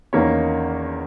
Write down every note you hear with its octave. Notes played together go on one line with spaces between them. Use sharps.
E2 D#3 A#3 C#4 C#5